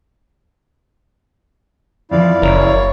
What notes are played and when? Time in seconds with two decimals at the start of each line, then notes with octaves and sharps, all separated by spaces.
2.11 F2 E3 F3 E4 D5 F5
2.42 F#1 A#4 C#5